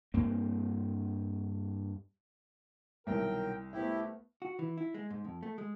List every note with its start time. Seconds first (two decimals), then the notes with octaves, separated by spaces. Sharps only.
0.14 G2 A#3 C4
3.07 C2 B2 D#3 F#3 A#4 G5
3.73 A3 B3 E4 G4 C5 E5
4.42 F#4
4.59 E3
4.78 E4
4.94 G#3
5.10 G#2
5.25 F2
5.43 A3
5.58 G#3